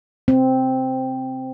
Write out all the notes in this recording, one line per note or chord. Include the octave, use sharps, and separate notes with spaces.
C4